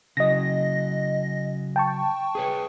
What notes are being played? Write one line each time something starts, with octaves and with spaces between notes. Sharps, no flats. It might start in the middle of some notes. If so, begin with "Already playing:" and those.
C#3 F#3 D#5 A#6
G5 A5 C#6
G#4 B4 C#5